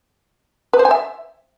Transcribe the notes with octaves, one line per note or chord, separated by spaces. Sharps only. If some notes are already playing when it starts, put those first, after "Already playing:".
B4
C5
G#5
E5